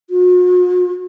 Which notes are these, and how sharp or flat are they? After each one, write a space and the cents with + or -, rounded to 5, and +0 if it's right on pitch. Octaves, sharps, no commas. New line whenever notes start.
F#4 -45